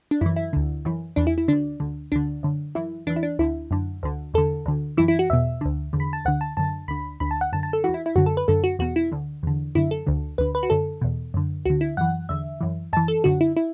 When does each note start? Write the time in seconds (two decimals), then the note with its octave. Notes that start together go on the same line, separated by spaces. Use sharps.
0.11 D4
0.21 F#2 E3 E4
0.36 E4
0.53 D2 D3
0.85 F#2 E3
1.16 E2 E3 D4
1.27 E4
1.38 E4
1.48 D2 D3 D4
1.80 D2 D3
2.12 D2 D3 D4
2.43 F#2 D3
2.75 F#2 E3 E4
3.07 E2 E3 D4
3.16 E4
3.23 D4
3.39 D2 D3 E4
3.71 F#2 D3
4.03 D2 D3
4.34 E2 D3 A4
4.66 D2 D3
4.97 F#2 E3 E4
5.08 E4
5.19 F#4
5.30 E2 B2 E5
5.61 D2 D3
5.93 E2 D3
6.00 B5
6.13 A5
6.25 D2 D3 F#5
6.41 A5
6.57 F#2 D3 A5
6.88 D2 D3 B5
7.20 D2 D3 B5
7.31 A5
7.41 F#5
7.53 F#2 D3 A5
7.63 A5
7.73 A4
7.84 E2 E3 F#4
7.94 E4
8.06 E4
8.16 F#2 D3 F#4
8.26 A4
8.37 B4
8.48 F#2 D3 A4
8.64 F#4
8.79 E2 B2 F#4
8.96 E4
9.12 D2 D3
9.43 E2 D3
9.75 F#2 D3 E4
9.91 A4
10.07 D2 D3
10.38 D2 D3 B4
10.55 B4
10.63 F#4
10.70 F#2 D3 A4
11.01 E2 B2
11.34 F#2 D3
11.65 D2 D3 F#4
11.81 E4
11.97 F#2 E3 F#5
12.29 E2 D3 E5
12.61 F#2 E3
12.93 F#2 E3 A5
13.08 A4
13.24 F#2 D3 F#4
13.41 E4
13.57 E4